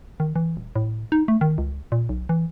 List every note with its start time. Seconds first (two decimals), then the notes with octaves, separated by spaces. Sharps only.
0.20 D#3
0.36 E3
0.57 D#1
0.76 A2
1.12 D#4
1.28 A3
1.41 D#3
1.58 C#2
1.92 A#2
2.09 B1
2.29 E3